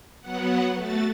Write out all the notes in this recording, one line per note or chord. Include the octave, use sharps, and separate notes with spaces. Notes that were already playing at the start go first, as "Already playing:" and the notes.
F#3 B3 F#5
A3 F#4 A6